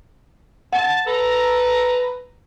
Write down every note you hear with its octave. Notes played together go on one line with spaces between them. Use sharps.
F#5 A5
A4 B4 A#5